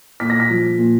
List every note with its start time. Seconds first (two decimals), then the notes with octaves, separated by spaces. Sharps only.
0.20 A#2 B6
0.30 A#6
0.40 B6
0.50 F3
0.78 A#2